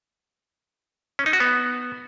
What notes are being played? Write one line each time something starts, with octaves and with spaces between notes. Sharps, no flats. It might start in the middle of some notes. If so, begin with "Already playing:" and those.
C#4
D#4
F#4
B3